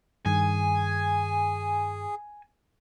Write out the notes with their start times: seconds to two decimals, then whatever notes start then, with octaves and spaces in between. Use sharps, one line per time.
0.26 G2 D#3 G#4 G#5